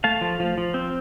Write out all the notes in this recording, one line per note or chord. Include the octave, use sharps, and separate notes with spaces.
A3 F5 A5
F3
F3
F3
C4